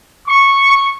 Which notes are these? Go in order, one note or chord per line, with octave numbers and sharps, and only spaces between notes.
C#6